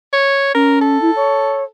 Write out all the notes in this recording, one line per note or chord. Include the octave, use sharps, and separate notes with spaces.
C#5
C#4 A#4
A4
E4
C#5